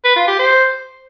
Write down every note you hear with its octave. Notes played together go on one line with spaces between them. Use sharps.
B4
F4
G4
C5